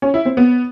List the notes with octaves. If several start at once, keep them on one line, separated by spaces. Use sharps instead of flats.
C#4
E4
C4
B3